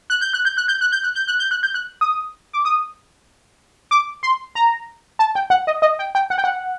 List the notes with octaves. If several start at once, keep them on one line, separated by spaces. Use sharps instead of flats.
F#6
G6
F#6
G6
F#6
G6
F#6
G6
F#6
G6
F#6
G6
F#6
G6
F#6
D#6
D6
D#6
D6
C6
A#5
A5
G5
F#5
D#5
D#5
G5
G5
F#5
G5
F#5